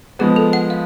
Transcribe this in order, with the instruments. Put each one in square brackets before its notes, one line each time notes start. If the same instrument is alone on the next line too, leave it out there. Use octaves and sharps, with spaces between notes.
[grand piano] F3 G#3 B3 [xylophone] G#4
[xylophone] A4
F#5
F5